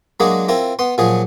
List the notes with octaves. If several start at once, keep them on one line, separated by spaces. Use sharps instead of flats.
F#3 G#3 A#3 D4 G#4
C4 E4 F4 A#4
B3 C6
A#2 F3 F#3 G#4